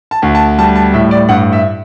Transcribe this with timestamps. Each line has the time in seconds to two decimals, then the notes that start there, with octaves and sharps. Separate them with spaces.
0.11 A5
0.22 D2
0.35 A5
0.58 G3 A5
0.76 A5
0.93 A2 E5
1.11 D5
1.29 G2 F#5
1.53 E5